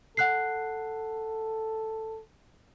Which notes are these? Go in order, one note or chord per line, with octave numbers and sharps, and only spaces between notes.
A4 F#5 F#6 C7